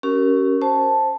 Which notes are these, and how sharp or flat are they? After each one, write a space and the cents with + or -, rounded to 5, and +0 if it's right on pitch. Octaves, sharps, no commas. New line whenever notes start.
C#4 +0 G4 -45 A#4 +0
C5 +10 A5 +0